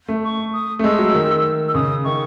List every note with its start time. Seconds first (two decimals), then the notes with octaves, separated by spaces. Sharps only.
0.08 A3
0.23 C#6
0.53 D#6
0.79 A3
0.84 G#3 E6
0.99 F#3
1.15 D#3
1.68 E6
1.74 C#3 D#6
2.04 D#3 C#6